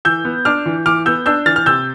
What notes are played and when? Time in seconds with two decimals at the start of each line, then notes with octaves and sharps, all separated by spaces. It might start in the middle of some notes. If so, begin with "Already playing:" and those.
0.05 E3 E6 G6
0.25 B3
0.45 D4 D6 F6
0.66 E3
0.86 E3 D6 F6
1.06 B3 E6 G6
1.26 D4 E6 G6
1.46 E3 F6 A6
1.56 F6
1.66 C3 E6 G6